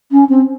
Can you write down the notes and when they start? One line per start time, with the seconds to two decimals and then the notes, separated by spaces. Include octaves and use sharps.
0.12 C#4
0.29 C4